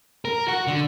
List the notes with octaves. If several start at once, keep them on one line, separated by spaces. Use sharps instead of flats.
A#4
F#4
D3